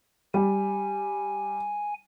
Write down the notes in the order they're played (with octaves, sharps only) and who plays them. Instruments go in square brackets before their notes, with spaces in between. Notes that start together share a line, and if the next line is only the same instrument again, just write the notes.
[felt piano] G3 [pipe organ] G#5